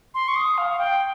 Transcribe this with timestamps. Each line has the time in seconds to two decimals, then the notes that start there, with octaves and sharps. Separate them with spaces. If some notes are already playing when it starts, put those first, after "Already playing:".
0.14 C6
0.28 C#6
0.36 D#6
0.58 F5
0.71 F5
0.79 G5